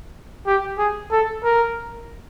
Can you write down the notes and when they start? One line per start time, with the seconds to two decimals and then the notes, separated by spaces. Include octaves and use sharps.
0.47 G4
0.79 G#4
1.12 A4
1.44 A#4